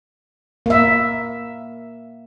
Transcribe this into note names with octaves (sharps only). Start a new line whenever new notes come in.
A#3 E5